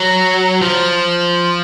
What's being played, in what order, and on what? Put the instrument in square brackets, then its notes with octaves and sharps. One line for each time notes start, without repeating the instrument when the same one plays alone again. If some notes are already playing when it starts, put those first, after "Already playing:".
Already playing: [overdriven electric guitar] F#3
F3